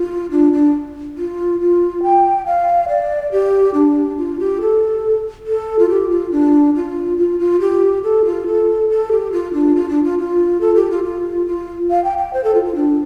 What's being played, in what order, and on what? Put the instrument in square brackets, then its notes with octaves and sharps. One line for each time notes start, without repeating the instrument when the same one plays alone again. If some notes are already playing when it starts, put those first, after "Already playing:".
Already playing: [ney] F4
D4
D4
F4
F4
G5
F5
D5
G4
D4
F4
G4
A4
A4
F4
G4
F4
D4
F4
F4
F4
G4
A4
F4
A4
A4
G4
F4
D4
F4
D4
F4
F4
A4
G4
F4
F4
F4
F5
G5
G5
C5
A4
F4
F4
D4